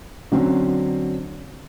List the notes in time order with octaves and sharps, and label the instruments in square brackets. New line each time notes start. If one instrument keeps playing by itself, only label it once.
[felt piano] D3 F#3 C4 C#4